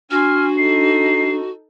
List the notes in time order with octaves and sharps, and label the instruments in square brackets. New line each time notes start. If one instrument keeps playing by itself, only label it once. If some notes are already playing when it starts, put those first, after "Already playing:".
[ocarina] D4 [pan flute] F#4 [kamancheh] G#5 C6 [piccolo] F6
[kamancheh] D#4 A4 [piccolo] C7